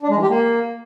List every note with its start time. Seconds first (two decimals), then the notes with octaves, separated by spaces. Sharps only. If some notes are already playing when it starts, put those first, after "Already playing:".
0.03 D4
0.09 G#3
0.16 E3
0.23 G4
0.29 A#3